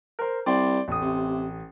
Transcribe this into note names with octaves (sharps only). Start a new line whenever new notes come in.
A#4 C5
C2 D5 G5 C6
A1 D#6
C3